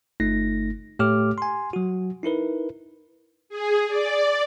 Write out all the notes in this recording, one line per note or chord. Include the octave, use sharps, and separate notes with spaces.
G1 A3 D#4 A#6
A2 A3 G4 C#5 D6 F6
G#5 C6
F#3 F#4
D#4 E4 A#4 B4
G#4
D5